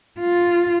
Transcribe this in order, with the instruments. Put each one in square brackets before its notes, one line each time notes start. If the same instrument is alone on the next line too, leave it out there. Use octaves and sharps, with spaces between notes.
[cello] F4